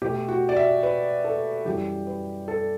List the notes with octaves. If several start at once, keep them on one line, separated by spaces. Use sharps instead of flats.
B2 A3 G4
F#4
D5
E5
B4
A4
F#2 E3 G3 G4
B4
A4